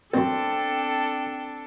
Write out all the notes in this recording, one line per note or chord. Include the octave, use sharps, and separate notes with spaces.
A1 F#2 C4 D4 A4 G5